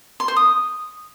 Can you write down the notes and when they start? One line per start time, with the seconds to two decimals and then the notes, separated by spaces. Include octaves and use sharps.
0.20 C6
0.28 C5
0.36 D#6